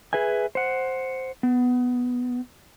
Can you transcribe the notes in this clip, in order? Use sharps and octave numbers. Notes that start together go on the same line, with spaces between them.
G#4 B4 E5 G#5
C5 F#5
B3